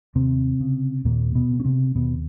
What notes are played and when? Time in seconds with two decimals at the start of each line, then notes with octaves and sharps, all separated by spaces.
0.15 D#2 C3 C4
0.60 C#3
1.05 D#2 A#2 A#3
1.35 B2 B3
1.50 C#3
1.60 C#4
1.64 C3 C4
1.95 D#2 B2 B3